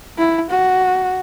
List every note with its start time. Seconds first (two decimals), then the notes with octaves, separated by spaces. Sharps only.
0.18 E4
0.50 F#4